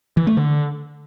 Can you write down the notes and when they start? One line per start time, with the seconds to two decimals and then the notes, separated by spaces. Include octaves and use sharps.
0.17 E3
0.27 A3
0.37 D3